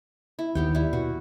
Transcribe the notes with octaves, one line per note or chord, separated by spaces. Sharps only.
E4
D#2 B3 G4 G5
G3 E4
B2 F#4